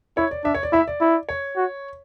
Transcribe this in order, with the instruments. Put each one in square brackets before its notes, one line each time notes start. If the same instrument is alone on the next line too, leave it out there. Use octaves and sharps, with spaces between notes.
[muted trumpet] E4 [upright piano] C#5
[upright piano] D5
[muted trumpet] D4 [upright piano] E5
[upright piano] C#5
D5
[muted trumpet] E4 [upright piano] E5
[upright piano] D5
[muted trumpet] E4
[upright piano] C#5
[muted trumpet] F#4